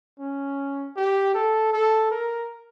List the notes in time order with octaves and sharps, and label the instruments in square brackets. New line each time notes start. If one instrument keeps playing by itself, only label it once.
[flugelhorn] C#4
G4
A4
A4
A#4